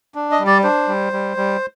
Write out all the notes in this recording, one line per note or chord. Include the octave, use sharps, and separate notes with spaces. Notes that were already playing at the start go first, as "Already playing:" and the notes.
D4
D#5
G3
D5
D4 C5
G3
G3
G3